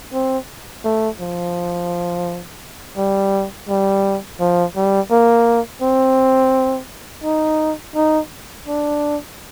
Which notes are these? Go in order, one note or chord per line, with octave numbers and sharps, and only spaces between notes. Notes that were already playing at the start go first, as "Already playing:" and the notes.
C4
A3
F3
G3
G3
F3
G3
A#3
C4
D#4
D#4
D4